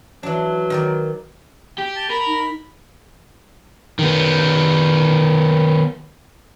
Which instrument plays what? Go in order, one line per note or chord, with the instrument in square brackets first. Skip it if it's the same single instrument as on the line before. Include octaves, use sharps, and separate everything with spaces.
[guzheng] E3 D4 [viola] F#3
[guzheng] D#3 A#4 D5
[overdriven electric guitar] G4
[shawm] A5
[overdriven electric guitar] A#4 [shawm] B5
[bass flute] D#4
[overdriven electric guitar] D#3 B3